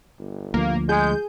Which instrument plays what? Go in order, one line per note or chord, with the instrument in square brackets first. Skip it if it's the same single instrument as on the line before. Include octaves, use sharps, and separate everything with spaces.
[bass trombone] G1
[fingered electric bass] D2 F3 [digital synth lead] A#3
[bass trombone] G#3 [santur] G#4 [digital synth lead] G6